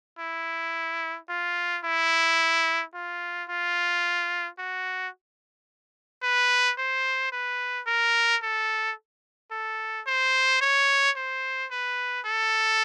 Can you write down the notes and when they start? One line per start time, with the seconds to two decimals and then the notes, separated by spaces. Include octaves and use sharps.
0.19 E4
1.29 F4
1.85 E4
2.95 F4
3.49 F4
4.59 F#4
6.23 B4
6.78 C5
7.32 B4
7.87 A#4
8.43 A4
9.51 A4
10.07 C5
10.61 C#5
11.17 C5
11.71 B4
12.26 A4